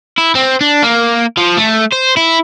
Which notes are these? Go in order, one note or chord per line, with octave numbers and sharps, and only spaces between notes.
E4
C4
D4
A#3
F3
A3
C5
E4